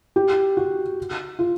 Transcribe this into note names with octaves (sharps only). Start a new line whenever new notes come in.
G4
F#4
F4